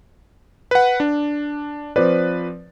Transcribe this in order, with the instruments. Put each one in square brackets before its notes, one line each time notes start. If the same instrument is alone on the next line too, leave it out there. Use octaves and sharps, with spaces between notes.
[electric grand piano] B4 F#5
D4
[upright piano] F3 C4 D5 [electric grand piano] B4